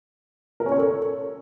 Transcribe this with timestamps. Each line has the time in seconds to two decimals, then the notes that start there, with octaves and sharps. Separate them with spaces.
0.60 A#4
0.66 C#4
0.72 C#5
0.78 A4